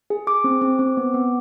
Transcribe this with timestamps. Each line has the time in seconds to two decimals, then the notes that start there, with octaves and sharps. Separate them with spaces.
0.10 G#4
0.27 G#4 D6
0.44 C4
0.62 C4
0.79 C4
0.97 B3
1.14 B3